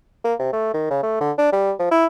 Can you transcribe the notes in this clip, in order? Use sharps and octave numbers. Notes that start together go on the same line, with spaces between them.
A#3
C3
A3
D#3
C#3
A3
D3
D4
G3
F3
E4